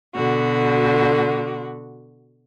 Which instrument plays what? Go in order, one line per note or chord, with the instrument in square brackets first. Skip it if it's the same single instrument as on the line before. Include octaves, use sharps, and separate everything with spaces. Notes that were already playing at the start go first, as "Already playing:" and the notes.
[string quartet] B2 D3 F#4